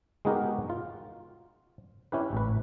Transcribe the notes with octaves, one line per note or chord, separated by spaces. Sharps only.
G#3 B3 D#4 F#4 G4 A#4
F4
C#4 E4 G4 B4
A1 B4